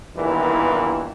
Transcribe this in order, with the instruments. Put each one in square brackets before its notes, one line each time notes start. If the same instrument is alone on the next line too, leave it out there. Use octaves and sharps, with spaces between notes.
[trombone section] E2 G2 A#2 D#3 E3